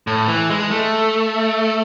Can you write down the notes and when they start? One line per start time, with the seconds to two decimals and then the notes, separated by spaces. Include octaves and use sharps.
0.07 A2
0.28 E3
0.50 G#3
0.71 A3